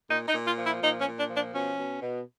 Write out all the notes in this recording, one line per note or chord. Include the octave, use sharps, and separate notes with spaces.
A#2 D#4
D#4
A#2
F4
F3
E4
A#2 D#4
C#4
A#2
D4
F3
D4
B2 C#4
B2
B2